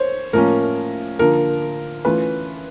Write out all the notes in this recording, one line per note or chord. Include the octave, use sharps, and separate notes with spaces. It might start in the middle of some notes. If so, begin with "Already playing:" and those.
Already playing: C5 C#5
A2 F3 A#3 C#4 A#4
D3 F3 A#3 A#4
E3 A3 C#4 F4 B4